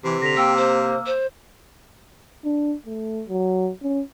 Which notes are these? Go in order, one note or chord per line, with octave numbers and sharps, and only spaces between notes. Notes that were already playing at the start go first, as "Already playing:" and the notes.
C3 E3
D3 A#6 B6 F7
A#3 G5 E6
C5
C5
D4
A3
F#3
C#4